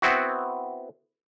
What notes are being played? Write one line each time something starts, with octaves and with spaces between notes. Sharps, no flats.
B3 C4 E4 F#4